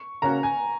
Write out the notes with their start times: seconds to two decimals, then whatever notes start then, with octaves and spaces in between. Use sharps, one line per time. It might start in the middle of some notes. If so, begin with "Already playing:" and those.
Already playing: C#6
0.22 C#3 A#3 C#4 F#4 A#5
0.43 G#5